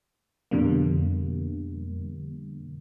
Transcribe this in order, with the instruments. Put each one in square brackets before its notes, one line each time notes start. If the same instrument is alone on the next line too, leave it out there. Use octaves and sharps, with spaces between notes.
[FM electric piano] F2 B2 D3 G3 A#3